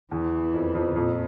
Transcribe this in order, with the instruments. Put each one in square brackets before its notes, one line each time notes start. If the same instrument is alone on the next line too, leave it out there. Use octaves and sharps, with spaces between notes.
[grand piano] E2 [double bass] E3
[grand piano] F2
F2
[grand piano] F2 [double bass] A#2